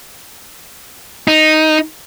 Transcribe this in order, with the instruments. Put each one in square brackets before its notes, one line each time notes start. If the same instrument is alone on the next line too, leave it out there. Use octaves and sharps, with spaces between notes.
[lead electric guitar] D#4